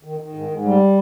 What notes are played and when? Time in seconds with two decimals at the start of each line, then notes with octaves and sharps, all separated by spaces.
0.03 D#3
0.19 D#3
0.34 G#2
0.49 G#2
0.64 G3